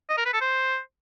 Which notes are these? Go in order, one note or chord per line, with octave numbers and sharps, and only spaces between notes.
D#5
A#4
B4
A4
C5